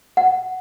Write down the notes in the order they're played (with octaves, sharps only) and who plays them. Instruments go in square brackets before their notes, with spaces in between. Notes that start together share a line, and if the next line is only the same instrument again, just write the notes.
[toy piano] F#5